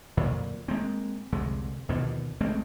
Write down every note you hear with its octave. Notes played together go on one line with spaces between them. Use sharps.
F2 A#2 D3 F#3
G#3 A#3 C4
C2 F2 D3 G#3
D#2 B2 D3 F3
A1 G#3 A3 C4